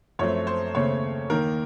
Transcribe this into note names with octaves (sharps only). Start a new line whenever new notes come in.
F#2 F3 A3 C4 C#5
C5
D#2 C#3 A3 C4 C#5
D#2 D#3 A#3 A#4